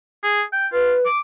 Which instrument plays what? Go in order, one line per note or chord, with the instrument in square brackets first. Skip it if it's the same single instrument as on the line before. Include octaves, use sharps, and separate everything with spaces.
[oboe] G#4
G5
[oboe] F4 [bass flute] B4
[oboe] D6